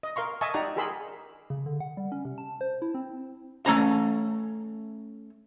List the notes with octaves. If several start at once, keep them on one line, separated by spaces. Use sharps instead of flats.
D#5
A#4 F5 C6 C#6
D#5 E5 G#5 A5 C#6
D#4 G4 D5 F#5 A#5
G4 G#4 A#4 B5 C6 E6
C#3
D3
F#5
G3
C#4
C3
A5
C5
E4
C4
A3 C#4 A#5